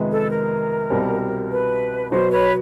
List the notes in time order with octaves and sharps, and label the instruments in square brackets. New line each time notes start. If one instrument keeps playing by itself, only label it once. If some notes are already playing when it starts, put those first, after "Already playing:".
Already playing: [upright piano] F2 C3 D#3 G#3 B3
[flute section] A4
A#4
[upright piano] C2 B2 G3 C4
[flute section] B4
[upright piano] B2 F#3 B3 [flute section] C5
[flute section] B4 C#5